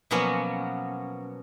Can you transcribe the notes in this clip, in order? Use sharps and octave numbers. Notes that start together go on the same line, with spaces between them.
B2 F3 F#3 A#3 B3 C#4